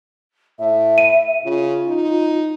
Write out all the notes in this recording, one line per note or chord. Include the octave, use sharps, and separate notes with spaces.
A2 E5
D#7
C#3 F4
D#4